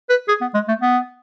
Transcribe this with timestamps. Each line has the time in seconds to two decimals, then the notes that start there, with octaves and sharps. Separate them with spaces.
0.10 B4
0.28 G#4
0.41 B3
0.54 G#3
0.68 A3
0.82 B3